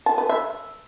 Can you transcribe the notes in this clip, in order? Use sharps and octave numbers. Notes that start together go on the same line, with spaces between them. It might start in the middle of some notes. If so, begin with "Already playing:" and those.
A5
B4
E5